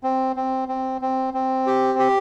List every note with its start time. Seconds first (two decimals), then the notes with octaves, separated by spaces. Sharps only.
0.03 C4
0.36 C4
0.68 C4
1.01 C4
1.34 C4
1.67 G4
1.99 G4